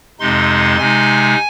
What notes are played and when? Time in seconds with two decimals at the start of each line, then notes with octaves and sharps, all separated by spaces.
0.20 F2 C3 G#3 D#4 C6
0.79 C3 G#3 D#4 G#5